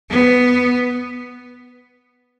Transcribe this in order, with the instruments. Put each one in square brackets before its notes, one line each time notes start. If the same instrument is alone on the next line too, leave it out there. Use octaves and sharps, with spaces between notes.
[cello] B3